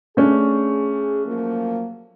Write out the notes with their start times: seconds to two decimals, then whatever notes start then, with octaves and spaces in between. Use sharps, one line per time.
0.17 A3 C#4 D4 G#4
1.25 F3 F#3 A#3